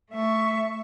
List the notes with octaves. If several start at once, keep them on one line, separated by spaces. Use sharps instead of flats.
A3 E5 C#6